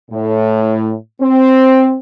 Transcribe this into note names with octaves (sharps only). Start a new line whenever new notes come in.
A2
C4